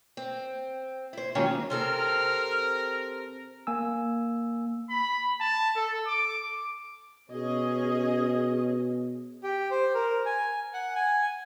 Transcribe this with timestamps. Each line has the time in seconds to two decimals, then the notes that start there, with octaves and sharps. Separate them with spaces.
0.17 C4
1.13 E4 C5
1.35 D#3 F#3 G#3 A#3 C#4 F4
1.70 C3 C4 A4 A#4 F6
3.67 A#3 G#5 E6
4.90 B5
5.40 A5
5.76 A4
6.07 D6
7.31 B2 C#4 G#4 D#5
9.42 G4
9.71 C5
9.94 A#4
10.26 G#5
10.74 F#5
10.95 G#5